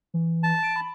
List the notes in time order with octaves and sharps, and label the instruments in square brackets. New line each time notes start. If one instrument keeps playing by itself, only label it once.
[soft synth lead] E3
[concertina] A5
[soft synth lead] D7
B5